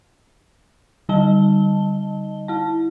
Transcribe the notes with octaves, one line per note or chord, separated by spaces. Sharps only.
D3 G3 D#4 D#5 A5 G7
E4 A5